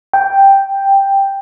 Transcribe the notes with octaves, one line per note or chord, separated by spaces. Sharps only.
G5